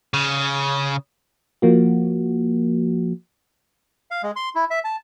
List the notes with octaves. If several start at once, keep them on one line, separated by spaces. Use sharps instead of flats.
C#3
F3 A#3 F#4
F5
G#3
C6
E4
E5
A5